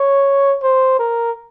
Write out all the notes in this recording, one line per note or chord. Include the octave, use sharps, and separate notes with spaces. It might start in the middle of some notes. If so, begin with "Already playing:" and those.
Already playing: C#5
C5
A#4